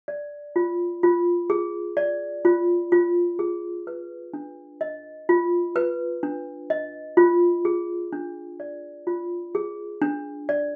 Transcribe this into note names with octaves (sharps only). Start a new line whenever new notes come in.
D5
F4
F4
G#4
D5
F4
F4
G#4
B4
D4
D#5
F4
B4
D4
D#5
F4
G#4
D4
D5
F4
G#4
D4
D5